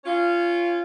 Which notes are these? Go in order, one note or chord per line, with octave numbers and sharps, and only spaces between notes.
C#4 F4